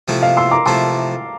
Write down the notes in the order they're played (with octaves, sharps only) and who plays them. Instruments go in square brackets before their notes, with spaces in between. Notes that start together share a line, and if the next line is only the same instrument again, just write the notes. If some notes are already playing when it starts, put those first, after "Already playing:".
[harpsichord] C3 F3 A3 E4
[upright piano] F5
C6 E6
A#5 D6
[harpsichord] C3 F3 A3 E4 [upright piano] A5 C6